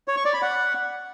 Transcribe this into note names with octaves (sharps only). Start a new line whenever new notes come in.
C#5
C#6
D5
B5
F#5